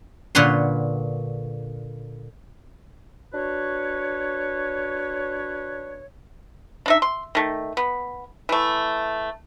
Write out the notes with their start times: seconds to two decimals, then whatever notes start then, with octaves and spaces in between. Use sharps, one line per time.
0.35 A#2 D3 B4 C#5 F#5 C6
3.33 D4 F#4 B4 C#5
6.86 D4 D#4 E5
7.02 C6
7.35 D#3 A3
7.77 B3
8.49 E3 A3